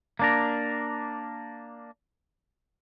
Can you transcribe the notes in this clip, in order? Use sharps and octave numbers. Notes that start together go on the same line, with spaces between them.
A#3 D4 A#4